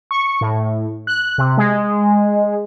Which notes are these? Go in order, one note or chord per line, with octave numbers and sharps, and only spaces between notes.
C#6
A2
F#6
C3
G#3